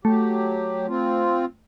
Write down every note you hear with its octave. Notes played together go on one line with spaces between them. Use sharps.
F#3 A3 G4
C4 F4